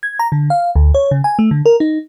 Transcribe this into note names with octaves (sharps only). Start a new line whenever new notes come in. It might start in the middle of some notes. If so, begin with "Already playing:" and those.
G#6
A#5
D3
F5
D2
C#5
C#3
G#5
A3
D3
A#4
D#4